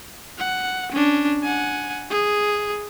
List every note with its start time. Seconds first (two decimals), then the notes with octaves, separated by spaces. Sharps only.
0.38 F#5
0.92 C#4 D4
1.43 F#5 G#5
2.10 G#4